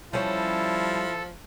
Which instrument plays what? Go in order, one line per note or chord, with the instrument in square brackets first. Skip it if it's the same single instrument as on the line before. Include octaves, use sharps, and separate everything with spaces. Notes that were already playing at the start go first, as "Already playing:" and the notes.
[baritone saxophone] F3 [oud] G3 C#4 [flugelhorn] E4 [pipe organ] A4